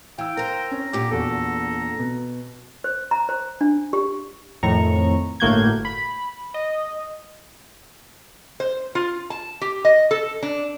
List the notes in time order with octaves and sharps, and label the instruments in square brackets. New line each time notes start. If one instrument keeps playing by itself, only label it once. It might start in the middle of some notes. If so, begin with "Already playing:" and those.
[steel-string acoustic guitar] E3 [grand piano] F5 E6 [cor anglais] G5
[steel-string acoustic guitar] A#4 C5 [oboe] A#5
[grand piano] C#4
[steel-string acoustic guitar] A#2 D3 [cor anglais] G4
[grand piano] E2 F#4 [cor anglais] A4
[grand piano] B2
[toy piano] C5
A#5
C5
D4
G4
[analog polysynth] F2 A2 D#3 A#5 C#6
G1 A2 A#3 F#4 G6 G#6
B5
D#5
[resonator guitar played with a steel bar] C5
F4
A5
G4
D#5
A4
D4